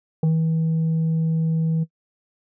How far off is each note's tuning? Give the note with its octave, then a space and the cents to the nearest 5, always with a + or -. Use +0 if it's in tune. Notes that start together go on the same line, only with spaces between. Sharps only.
E3 -35